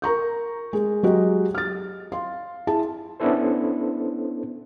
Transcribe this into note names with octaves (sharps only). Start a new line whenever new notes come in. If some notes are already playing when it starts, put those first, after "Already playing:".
A#4 A#5 C#6 G6
G#3 G#4
F#3 G#3 F#4 G4 D#5
F6 A6
F5 C6
E4 G#4 A5
B3 C#4 D4 E4 A4 C5